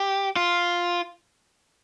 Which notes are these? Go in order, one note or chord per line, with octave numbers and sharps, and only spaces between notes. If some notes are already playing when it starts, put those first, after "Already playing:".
Already playing: G4
F4